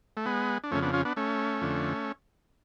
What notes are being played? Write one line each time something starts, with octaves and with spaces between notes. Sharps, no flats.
A3
G#3 B3
D4
F2 C#3 A3 C#4
B3 D4
C#4 F4
B3 D4
A3 C#4
F2 D3